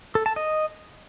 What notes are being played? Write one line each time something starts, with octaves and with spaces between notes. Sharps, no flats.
A4
A5
D#5